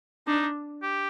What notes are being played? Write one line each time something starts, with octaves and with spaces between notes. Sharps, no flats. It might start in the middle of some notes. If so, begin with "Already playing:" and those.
D4 D#4
G4